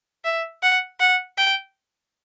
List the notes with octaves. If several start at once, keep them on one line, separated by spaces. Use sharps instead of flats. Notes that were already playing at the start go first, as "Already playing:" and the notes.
E5
F#5
F#5
G5